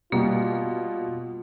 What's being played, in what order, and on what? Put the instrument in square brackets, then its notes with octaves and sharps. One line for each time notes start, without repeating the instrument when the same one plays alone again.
[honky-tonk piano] B2 [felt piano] G3 [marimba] A#3 [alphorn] F4